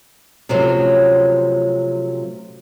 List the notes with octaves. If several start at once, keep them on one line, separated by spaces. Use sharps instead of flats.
C3 F3 F#3 A3 C4 C#4